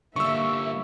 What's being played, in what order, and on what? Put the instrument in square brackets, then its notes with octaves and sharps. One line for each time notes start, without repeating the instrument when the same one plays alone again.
[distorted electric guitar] D3 G3 [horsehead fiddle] A#3 E5 [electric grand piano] C#6 E6